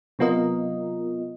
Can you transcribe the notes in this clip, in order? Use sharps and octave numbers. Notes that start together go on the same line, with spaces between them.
C3 F#3 B3 F4 A#4 D#5